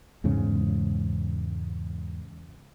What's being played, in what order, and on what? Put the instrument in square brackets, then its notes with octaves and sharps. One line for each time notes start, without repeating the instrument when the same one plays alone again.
[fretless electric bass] E2 G#2 C#3 G#3